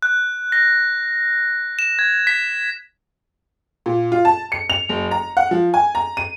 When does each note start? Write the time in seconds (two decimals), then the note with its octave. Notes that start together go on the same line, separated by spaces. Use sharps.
0.02 F#6
0.52 A#6
1.79 E7
1.99 G#6
2.27 B6
3.86 A#2
4.12 F4
4.25 A5
4.52 C#7
4.70 F7
4.89 F#1
5.11 A#5
5.37 F#5
5.51 F3
5.74 G#5
5.95 A#5
6.17 D#7